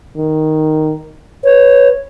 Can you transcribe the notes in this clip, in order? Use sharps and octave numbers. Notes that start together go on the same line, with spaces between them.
D#3
B4 C#5